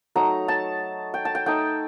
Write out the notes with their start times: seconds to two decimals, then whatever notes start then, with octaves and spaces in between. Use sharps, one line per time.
0.15 F#3 A3 D#4 A#5
0.48 A5
1.14 G5
1.25 A5
1.35 G5
1.46 A3 D#4 G5